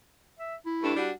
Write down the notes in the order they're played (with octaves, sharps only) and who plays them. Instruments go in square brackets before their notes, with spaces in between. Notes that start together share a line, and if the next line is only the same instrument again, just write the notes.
[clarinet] E5
E4
[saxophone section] G2 A3 D4
G3 D4 F#4